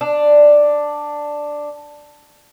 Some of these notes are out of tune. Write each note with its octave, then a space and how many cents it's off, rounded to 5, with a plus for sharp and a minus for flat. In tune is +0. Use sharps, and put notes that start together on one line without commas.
D4 +5